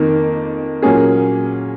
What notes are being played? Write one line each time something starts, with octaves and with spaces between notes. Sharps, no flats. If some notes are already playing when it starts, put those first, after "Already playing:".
Already playing: F2 D#3 A#3 D#4 A#4
A#2 F#3 A#3 C#4 G#4